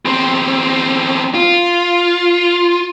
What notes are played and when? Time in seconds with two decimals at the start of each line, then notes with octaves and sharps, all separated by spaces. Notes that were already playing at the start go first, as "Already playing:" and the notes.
0.05 E2 C4
1.35 F4